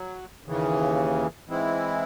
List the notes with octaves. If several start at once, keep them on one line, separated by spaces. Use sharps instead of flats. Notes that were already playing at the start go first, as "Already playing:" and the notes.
Already playing: F#3
D#2 C#3 E3
G#2 E3 G#3 C4 E4